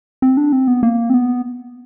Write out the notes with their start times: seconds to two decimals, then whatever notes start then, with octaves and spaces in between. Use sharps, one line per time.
0.22 C4
0.37 D4
0.52 C4
0.67 B3
0.83 A#3
1.10 C4
1.14 B3